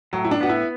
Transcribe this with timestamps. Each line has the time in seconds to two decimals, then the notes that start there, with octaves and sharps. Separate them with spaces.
0.13 A2 F#3
0.25 E4
0.31 D4
0.41 B3 F#4
0.49 E4